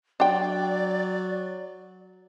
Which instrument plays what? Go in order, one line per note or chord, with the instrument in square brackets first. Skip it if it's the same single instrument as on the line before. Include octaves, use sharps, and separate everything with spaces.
[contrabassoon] F#3 [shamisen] D4 G5 [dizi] D5